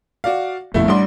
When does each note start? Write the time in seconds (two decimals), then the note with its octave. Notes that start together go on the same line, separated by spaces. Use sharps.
0.24 F#4 D5 F5
0.74 G1 F2 B2 A3 E4
0.88 A1 G3 D4 C6